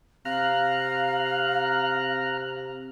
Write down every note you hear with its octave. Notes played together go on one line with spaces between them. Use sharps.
C3 F5 A#5 F6 F#6